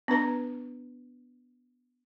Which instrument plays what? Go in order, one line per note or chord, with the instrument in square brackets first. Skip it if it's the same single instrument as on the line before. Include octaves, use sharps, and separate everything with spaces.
[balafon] B3 D4 B4 A#5